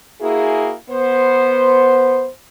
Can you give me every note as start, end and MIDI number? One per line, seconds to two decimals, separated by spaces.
0.21 0.73 58
0.21 0.73 64
0.21 0.73 66
0.21 0.73 68
0.90 2.27 59
0.90 2.27 72